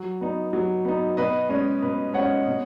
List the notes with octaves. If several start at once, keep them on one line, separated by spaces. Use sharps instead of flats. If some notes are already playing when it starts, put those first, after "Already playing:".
Already playing: F#3
B3 D#4
F#3
B3 D#4
B2 B4 D#5
G#3 C#4
B2 B4
G#3 C#4 C#5 F#5
B2